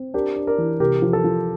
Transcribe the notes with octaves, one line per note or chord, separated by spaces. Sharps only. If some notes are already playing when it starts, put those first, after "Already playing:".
Already playing: C4
D4 G4 A#4
D4
A#4 D5
E3
C3 G4 A#4
F3
A4
F3